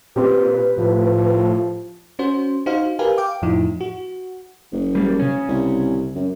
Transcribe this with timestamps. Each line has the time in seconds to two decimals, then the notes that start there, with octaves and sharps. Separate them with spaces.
0.16 A#2 C4 G4 B4
0.78 A2 F3
2.19 C#4 F#4 C5
2.66 D#4 F#4 C5 F5
2.99 G4 A#4 B4 F5 G#5
3.18 F5 G5 D6
3.42 F2 A2 F3 D#4 E4
3.81 F#4
4.72 F#1
4.95 G3 A#3
5.20 C#3 C#4
5.48 C2
6.16 F#2